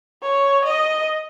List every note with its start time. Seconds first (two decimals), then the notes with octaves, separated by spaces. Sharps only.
0.22 C#5
0.65 D#5